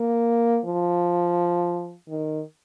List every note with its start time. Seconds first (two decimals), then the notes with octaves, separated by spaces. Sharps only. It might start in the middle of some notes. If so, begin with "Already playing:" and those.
Already playing: A#3
0.65 F3
2.10 D#3